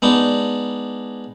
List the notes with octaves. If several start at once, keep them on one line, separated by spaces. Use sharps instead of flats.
G#3 B3 D4 D#4